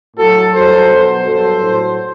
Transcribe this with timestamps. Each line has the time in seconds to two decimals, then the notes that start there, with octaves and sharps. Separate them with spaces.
0.17 A2 F#3 F#4 A4
0.53 G2 F#3 A4 C5
0.90 B2 F#3
1.25 G2 F#3 A4 C5
1.61 A2 F#3